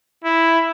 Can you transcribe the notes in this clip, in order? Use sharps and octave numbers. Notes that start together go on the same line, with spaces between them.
E4